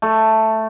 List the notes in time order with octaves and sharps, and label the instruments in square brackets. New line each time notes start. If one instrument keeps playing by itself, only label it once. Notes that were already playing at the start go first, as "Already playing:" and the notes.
[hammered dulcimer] A3